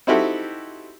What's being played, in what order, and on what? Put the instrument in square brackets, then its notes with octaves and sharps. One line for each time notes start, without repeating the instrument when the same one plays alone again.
[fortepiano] C4 D#4 E4 F#4 G4 A4